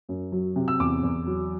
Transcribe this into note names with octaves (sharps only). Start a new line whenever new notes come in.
F#2
F#3
C3
E6
E2 D6
E2
F#3